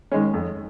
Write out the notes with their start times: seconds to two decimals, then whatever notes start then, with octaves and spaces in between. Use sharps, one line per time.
0.12 D#3 G#3 C#4
0.34 F2